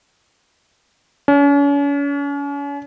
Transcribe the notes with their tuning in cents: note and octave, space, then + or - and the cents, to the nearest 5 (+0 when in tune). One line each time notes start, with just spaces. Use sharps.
C#4 +40